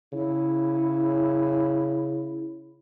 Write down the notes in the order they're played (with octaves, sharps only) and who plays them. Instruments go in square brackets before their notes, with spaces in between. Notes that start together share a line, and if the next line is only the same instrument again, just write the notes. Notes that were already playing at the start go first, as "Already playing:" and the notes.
[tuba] C#3 [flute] E4